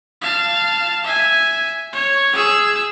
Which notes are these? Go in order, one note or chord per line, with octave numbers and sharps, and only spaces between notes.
F5 A5
E5 G#5
C#5
G#4 E6